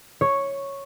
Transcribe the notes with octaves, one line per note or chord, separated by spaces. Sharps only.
C#5